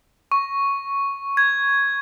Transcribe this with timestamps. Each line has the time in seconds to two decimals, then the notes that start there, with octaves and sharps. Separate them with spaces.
0.32 C#6
1.37 G#6